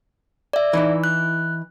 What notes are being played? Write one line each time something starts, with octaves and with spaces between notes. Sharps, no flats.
D5 E5
E3 D#4 E4
F#6